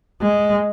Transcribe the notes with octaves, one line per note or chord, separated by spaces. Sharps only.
G#3